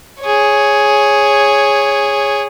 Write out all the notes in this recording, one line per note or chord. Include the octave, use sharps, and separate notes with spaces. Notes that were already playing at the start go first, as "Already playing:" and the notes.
G#4 C#5